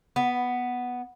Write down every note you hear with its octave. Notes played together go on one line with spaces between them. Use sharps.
B3